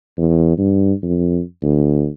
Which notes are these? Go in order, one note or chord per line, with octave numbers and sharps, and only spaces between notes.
E2
G2
F2
D2